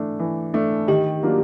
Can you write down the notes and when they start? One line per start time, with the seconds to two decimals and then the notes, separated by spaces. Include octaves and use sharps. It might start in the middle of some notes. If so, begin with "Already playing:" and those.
Already playing: E3 A3 D4
0.19 E3
0.54 A3 D4
0.88 D#3 G4
1.23 F#3 A#3 D4 F4